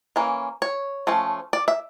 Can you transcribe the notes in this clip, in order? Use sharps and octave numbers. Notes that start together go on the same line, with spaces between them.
E3 A#3 C#4
C#5
F3 A3 C#4
D5
E5